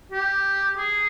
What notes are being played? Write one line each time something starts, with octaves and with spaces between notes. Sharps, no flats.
G4
G#4